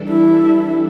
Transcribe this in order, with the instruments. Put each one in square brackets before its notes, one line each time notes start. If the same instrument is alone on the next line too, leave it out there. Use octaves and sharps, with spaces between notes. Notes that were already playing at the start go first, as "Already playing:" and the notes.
Already playing: [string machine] E3 G3 D4 A4
[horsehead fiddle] E4